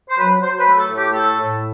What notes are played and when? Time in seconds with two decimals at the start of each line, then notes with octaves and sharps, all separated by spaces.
0.09 C5
0.18 F#3 B4
0.42 F#3 C5
0.56 C5
0.60 B4
0.67 A3
0.78 A4
0.90 A2
0.97 G4
1.10 G4
1.14 A3 A4
1.38 A2